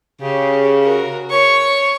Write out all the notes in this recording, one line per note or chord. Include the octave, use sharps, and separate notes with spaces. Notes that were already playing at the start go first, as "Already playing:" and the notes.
C#3 G4
F#4 A#4
C#5 C#6